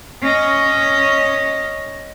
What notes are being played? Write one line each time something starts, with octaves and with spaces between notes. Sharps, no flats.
C#4 D#5